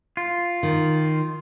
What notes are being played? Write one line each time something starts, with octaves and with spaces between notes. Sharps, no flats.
F4
D#3